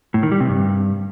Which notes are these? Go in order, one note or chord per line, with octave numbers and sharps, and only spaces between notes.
A2
D#3
G3
C3
G2